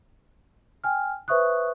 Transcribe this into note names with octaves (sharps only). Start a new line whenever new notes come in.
G5 G#5 F6
B4 C5 E5 C#6 D#6 F#6